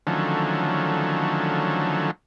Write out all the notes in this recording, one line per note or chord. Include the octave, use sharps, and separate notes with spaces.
D3 D#3 F3 F#3 A3 C#4